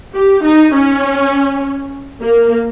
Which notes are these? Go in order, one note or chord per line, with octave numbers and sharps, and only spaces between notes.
G4
D#4
C#4
A#3